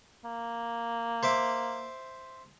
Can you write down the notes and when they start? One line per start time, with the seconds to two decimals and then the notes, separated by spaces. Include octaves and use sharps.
0.24 A#3
1.23 C5 E5 D6